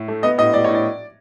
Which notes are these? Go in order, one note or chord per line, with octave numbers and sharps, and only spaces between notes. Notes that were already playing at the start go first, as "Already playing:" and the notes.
Already playing: A2
A3
B3 D#5
A2 D#5
A2 D5
A2 C#5
D5